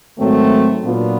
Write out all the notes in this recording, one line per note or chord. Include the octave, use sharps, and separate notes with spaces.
G#2 D#3 F#3 A3 C4
A#2 F#3 B3 D4 F4